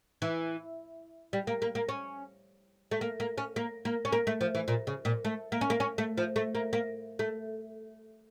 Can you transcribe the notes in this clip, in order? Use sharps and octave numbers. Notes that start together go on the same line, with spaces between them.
E3
G3
A#3
A#3
A#3
C#4
A3
A#3
A#3
C#4
A#3
A#3
C#4
A#3
A3
F3
E3
A#2
C#3
A#2
A3
A#3
C#4
A#3
C#4
A3
F3
A3
A#3
A#3
A3